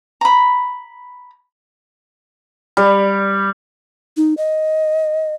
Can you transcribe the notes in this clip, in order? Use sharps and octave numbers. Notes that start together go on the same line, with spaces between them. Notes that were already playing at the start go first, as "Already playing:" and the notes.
A#5 B5
G3
D#4
D#5